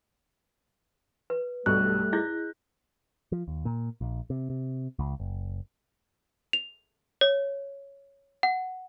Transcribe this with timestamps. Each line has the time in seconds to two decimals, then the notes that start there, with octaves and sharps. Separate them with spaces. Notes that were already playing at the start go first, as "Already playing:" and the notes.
1.30 B4
1.66 B1 G2 G3 A3 C#6 F#6
2.13 E4 G#4 D#5 G6 A#6
3.32 F3
3.48 D#2
3.65 A#2
4.01 A#1
4.30 C3
4.50 C3
4.99 C#2
5.20 F#1
6.53 F7
7.21 C#5
8.43 F#5